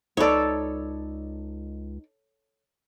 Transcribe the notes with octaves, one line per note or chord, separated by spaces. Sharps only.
C#2 D#4 A4 B4 C#5 D5